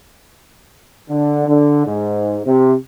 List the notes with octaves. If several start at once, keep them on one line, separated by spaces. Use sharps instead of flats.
D3
D3
G#2
C3